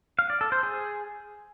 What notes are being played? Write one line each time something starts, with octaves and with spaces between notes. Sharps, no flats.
F5
D5
A4
C5
G#4